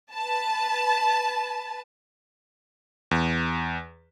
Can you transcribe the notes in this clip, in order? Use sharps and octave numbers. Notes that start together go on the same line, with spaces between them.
B4 A5
E2